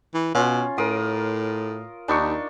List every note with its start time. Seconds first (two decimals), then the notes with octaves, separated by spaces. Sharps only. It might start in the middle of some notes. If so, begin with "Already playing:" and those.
0.14 E3
0.35 B2 C#4 F4
0.78 A2 A#4 C6 D#6
2.08 D#2 D4 D#4 C#6